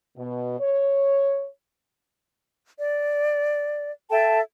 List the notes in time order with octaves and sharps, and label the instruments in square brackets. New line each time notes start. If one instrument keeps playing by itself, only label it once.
[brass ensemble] B2
C#5
[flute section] D5
A4 E5 G5 A5